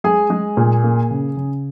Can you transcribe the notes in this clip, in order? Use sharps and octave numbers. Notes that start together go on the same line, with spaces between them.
G#3 G#4 G#5
G#3
A#2
A#3
C#3
C#3